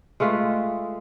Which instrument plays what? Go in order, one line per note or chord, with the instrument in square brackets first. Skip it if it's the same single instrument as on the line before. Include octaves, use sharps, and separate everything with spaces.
[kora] G#3 A3 F4 B4